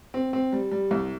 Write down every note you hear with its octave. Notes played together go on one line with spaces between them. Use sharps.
C4
C4
G3
G3
C2